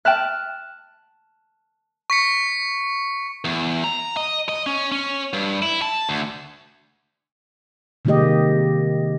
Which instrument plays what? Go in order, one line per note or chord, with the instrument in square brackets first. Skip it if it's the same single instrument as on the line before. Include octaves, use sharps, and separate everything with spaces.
[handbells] E5 G5 [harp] A5 F6 F#6
[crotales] C#6 B6 C#7
[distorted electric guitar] E2
A#5
D#5
D#5
C#4
C#4
G2
E4
A5
D2
[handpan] C3 D#3 G#3 A#3 G4 D#5